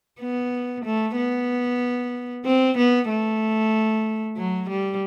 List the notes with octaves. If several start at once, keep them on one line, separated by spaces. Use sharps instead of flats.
B3
A3
B3
C4
B3
A3
F#3
G3